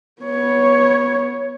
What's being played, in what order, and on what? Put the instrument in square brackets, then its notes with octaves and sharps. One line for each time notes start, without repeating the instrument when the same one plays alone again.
[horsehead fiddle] B3 C#5